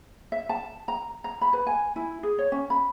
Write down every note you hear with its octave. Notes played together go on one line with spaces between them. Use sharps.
E5
A5
A#5
A#5
B5
B4
G#5
E4
G#4
C#5
C#4
B5